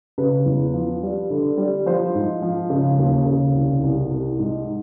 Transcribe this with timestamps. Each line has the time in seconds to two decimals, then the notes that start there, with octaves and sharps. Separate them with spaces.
0.18 C#3 B4
0.46 E2
0.74 F3
1.02 G3
1.30 D3
1.57 G3
1.86 F3 C5
2.15 G#2
2.42 F3
2.70 C#3
2.98 D#2
3.26 C#3
3.55 C2
3.83 C2
4.11 C2
4.39 G#2